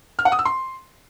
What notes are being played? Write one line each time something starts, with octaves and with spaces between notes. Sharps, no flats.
F6
F#5
D#6
E6
C6